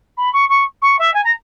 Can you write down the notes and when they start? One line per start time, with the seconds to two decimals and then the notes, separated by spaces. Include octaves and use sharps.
0.17 B5
0.33 C#6
0.49 C#6
0.82 C#6
0.99 E5
1.14 G#5
1.24 A#5